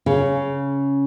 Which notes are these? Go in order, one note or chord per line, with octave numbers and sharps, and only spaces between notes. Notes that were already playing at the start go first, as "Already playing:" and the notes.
C#3